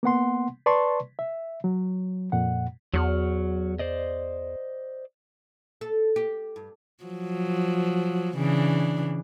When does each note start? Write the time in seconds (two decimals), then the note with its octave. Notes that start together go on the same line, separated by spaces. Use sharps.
0.03 A#3 B3 F#5 C6
0.66 B4 D5 A5 C6 C#6
1.19 E5
1.64 F#3
2.32 F2 A#2 F#5
2.94 E2 F#3 F#4 F6
3.79 C5 D5 D#5
5.81 A4
6.16 G4
6.56 G2
7.04 F3 F#3
8.37 C#3 E3 D4